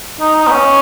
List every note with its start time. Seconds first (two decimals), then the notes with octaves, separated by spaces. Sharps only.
0.20 D#4
0.36 D#4
0.47 B3
0.51 C#4